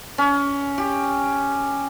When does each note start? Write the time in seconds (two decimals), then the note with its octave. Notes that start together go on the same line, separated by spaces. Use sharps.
0.18 C#4
0.78 G4